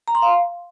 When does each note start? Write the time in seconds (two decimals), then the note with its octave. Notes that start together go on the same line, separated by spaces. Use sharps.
0.08 A#5
0.15 C6
0.22 F5